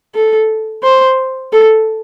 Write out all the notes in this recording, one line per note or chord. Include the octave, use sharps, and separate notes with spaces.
A4
C5
A4